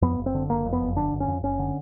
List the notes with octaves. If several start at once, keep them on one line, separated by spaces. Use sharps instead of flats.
F2 B3
F#1
C4
D3
F#1 A#3
F2
B3
F#1
D3 D4
F#1
C#4
F2
F#1 C#4
D3